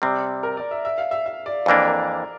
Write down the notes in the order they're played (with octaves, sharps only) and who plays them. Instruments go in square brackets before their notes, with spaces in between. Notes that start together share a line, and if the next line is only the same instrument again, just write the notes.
[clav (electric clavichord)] C3 G3 C4 [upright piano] D5
[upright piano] A#4
D5
E5
E5
F5
E5
E5
D5
[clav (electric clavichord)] F2 E3 A#3 D4 [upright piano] D5
[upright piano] A#4